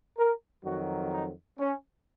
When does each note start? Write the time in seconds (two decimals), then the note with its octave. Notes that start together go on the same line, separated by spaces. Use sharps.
0.17 A#4
0.64 F2 D#3 F#3 F#4
1.12 D#4
1.59 C#4